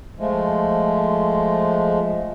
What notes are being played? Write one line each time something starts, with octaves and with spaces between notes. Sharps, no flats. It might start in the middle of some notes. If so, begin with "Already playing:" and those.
F3 G#3 A3